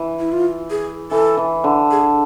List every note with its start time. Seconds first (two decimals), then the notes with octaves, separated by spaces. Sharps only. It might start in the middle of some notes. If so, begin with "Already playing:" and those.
Already playing: E3
0.20 E4
0.32 F4
0.71 G#4
1.11 E3 A4
1.37 E3
1.64 D3
1.91 G#4